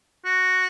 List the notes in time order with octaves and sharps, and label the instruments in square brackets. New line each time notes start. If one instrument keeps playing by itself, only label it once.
[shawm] F#4